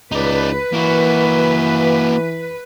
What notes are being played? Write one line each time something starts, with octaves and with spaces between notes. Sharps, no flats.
C#2 D#4 B4 D5
E3 A#3 F#4